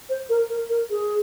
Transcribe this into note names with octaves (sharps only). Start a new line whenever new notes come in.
C5
A#4
A#4
A#4
G#4